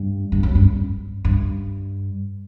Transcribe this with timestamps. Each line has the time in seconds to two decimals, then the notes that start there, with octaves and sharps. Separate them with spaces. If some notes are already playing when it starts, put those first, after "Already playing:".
Already playing: G2
0.32 G2
0.43 F#2
0.55 G2
1.25 G2